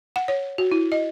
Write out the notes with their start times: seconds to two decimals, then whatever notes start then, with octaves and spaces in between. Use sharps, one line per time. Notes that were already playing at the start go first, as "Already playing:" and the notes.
0.16 F#5
0.28 C#5
0.58 F#4
0.71 E4
0.92 D#5